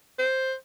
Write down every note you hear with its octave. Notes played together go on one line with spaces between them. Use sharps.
C5